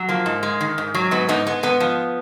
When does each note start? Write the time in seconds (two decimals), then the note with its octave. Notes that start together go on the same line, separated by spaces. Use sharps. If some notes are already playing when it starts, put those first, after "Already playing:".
Already playing: F#3
0.09 F3 A#3
0.26 G#2
0.43 G#3
0.61 D#3
0.78 G#2
0.94 F#3
1.11 G#2 B3
1.29 G#2 B3 D#4
1.47 G#3 B3
1.63 G#2 B3
1.80 F3